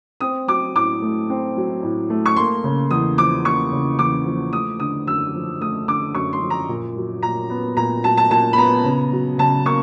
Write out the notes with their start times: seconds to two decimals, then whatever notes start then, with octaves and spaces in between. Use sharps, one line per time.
0.21 C4 D#6
0.48 F#3 D6
0.75 A2 D6
1.02 A3
1.30 C4
1.57 F#3
1.83 A2
2.10 A3
2.26 C#6
2.36 A#3 C6
2.64 C#3
2.91 E2 D#6
3.18 F3 D6
3.45 A#3 C#6
3.72 C#3
3.99 E2 D6
4.26 F3
4.53 A3 D#6
4.80 D3 D#6
5.07 F#2 E6
5.34 F3
5.61 A3 D#6
5.88 D3 D6
6.15 F#2 C#6
6.33 C6
6.41 F3
6.50 A#5
6.69 A#2
6.96 F#3
7.23 A#2 A#5
7.50 B3
7.77 A#2 A#5
8.04 F#3 A5
8.17 A5
8.30 A#2 A5
8.53 B5
8.57 B3 A#5
8.85 C#3
9.12 F#3
9.38 C#3 A5
9.66 A#3 C#6